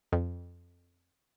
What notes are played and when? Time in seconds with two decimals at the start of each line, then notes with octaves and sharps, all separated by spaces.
0.12 F2